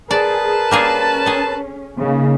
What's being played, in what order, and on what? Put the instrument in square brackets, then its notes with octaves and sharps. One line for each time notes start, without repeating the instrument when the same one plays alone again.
[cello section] G#4 [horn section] A#4 B4 A5 [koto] D5
[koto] G3 A#3 G#4 [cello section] C#4
[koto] G#4 A4
[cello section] C#3 A#3 D#4